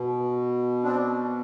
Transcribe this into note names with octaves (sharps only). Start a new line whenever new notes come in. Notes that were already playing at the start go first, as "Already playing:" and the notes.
Already playing: B2
C4 D4